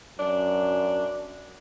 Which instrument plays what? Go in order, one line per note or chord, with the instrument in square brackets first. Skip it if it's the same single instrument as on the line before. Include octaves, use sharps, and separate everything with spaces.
[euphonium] F#2 [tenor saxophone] D4